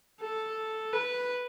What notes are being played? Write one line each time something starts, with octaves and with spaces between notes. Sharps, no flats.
A4
B4